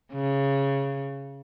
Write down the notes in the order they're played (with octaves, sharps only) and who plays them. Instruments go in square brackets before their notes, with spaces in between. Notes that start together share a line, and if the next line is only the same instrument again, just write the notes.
[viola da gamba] C#3